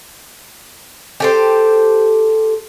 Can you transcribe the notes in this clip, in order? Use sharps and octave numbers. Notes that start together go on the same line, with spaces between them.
G4 A4 C5